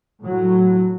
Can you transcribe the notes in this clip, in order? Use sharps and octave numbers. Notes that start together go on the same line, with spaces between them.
A2 F#3